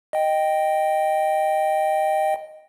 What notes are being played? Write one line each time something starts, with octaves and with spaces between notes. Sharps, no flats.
D#5 G5